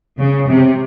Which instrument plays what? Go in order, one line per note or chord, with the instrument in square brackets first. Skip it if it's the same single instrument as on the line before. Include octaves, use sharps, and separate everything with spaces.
[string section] C#3
C3